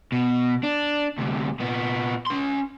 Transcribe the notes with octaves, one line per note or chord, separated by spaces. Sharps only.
B2
D4
D2 C3
A#2 B3
C#4 C6